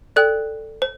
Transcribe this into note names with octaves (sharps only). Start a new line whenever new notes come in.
A4 D5 G5 F#6
C5